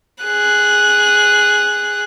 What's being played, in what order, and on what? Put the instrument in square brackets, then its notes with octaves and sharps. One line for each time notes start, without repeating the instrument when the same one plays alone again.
[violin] G#4 F#6